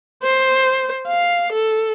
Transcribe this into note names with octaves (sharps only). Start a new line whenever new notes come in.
C5
F5
A4